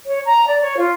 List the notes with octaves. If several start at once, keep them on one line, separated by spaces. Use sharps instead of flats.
C#5
A#5
D5
C#5
F4